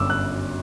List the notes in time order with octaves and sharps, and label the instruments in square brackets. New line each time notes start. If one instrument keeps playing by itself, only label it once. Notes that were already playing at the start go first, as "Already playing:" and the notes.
Already playing: [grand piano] G1 F#2 D6 E6
F#6